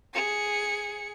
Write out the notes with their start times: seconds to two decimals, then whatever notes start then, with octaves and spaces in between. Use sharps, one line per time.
0.14 G#4 C#7